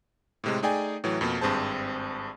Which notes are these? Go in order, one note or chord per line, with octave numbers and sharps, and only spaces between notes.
A2 C3 G#3
A3 D#4 G#4 D5 G5 G#5
A2 E3 F#3
F2 B2 A#3
G#1 G2 C4 G#4 C5 A5